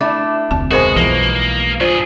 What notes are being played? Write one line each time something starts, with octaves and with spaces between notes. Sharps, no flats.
A3 D4 E4 D6
F1 D2 C4 A5
B2 G#3 F#4 A#4 C5 G#5
B1 E3 F3 A#3
G2 F4 G#4 C5 D5